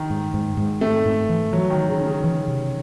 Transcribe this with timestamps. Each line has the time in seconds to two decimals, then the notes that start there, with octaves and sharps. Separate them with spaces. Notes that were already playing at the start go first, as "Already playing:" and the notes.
Already playing: D#3
0.10 G#2
0.34 G#2
0.57 G#2
0.81 A3 C4
1.05 G#2
1.29 E3
1.53 E3 F#3
1.70 D#3
1.77 E3
1.89 C#3
2.01 C#4
2.07 C#3
2.24 E3
2.48 C3